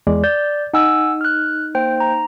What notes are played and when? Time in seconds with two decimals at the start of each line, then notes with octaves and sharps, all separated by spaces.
0.07 E2 G#3 D5
0.24 D5 G6
0.74 D#4 F#5 G#5 E6
1.21 F6 F#6
1.75 A#3 C5 G5
2.00 A#5